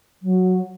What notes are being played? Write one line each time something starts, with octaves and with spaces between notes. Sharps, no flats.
F#3